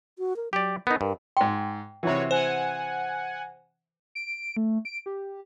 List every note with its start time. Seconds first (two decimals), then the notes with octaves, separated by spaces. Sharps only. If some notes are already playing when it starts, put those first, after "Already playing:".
0.19 F#4
0.36 A#4
0.53 F#3 G4 D5
0.87 B3 D#4 A#4
1.01 G2 A#4
1.37 G#2 G5 C6
2.03 C3 E3 F#4 B4 C#5
2.31 C5 F#5 G#5
4.15 D7
4.57 A3
4.85 D7
5.06 G4